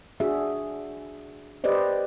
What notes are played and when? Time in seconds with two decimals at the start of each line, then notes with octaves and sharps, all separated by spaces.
0.20 D4 F#4 G#4 E5
1.64 G4 B4 C5 D5 D#5